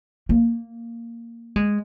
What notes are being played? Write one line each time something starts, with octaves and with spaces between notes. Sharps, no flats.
A#3
G#3